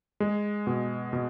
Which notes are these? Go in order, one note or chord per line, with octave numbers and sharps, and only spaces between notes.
G#3
B2
B2